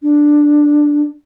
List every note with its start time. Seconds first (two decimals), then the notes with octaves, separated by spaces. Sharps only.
0.03 D4